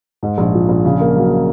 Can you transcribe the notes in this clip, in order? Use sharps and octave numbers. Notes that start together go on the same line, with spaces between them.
G#2
A#1
F3
A#1
C#3
A#3
F#3